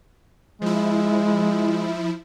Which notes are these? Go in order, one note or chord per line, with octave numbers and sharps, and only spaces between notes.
F3 G#3 E4